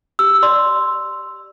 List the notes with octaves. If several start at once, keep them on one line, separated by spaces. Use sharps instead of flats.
G4 E6
D5 C6